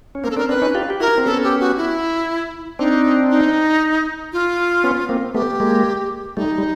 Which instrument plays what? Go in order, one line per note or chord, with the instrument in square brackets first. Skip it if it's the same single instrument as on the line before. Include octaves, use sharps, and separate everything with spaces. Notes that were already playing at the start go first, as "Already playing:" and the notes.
[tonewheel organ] C#4
[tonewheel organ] A#3 C4 [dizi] A#4
[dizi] A4
[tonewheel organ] C4 D4 [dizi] A#4
[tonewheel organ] C4 D4 [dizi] B4
[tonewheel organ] C#4 D#4
F4 G4
G4
[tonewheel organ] E4 F#4 [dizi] A#4
[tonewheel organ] C4
[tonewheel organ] B3 C#4 [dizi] A4
[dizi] G4
F#4
E4
[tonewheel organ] C4 D4 [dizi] D#4
[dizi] D#4
F4
[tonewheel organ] B3 C#4
A#3 C4
[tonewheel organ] A3 B3 [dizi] G4
[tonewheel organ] G#3 A#3
[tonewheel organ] G3 A3 [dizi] D#4
[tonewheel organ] G3